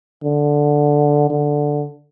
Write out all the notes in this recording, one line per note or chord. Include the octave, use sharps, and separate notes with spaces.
D3
D3